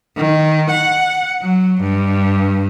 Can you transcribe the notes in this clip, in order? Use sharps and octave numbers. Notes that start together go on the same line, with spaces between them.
D#3
F#5
F#3
G2